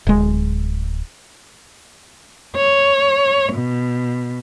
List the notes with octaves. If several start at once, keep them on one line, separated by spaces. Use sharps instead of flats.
D1 G#3
C#5
B2